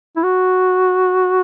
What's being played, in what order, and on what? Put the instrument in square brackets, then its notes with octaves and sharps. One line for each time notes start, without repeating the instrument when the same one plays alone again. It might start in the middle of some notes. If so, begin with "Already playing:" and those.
[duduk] E4
F#4